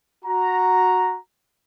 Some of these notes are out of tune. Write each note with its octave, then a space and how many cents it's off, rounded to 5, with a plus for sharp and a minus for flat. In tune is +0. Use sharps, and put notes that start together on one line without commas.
F#4 -10 A#5 +0